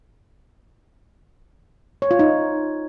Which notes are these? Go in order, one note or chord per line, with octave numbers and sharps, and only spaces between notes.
C#5
F4
D#4